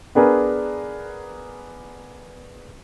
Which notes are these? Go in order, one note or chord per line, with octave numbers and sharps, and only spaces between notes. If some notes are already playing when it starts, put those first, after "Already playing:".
B3 D4 G#4 A#4 B4